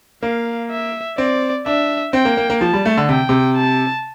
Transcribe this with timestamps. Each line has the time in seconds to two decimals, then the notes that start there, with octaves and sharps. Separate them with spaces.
0.23 A#3 F5
0.71 E5
1.18 C4 D5
1.66 D4 E5
2.13 C4 G5
2.25 A#3
2.37 A#3
2.50 A#3
2.61 F3 A5
2.73 G3
2.85 A3
2.97 D3
3.09 C3 G5
3.29 C3
3.57 A5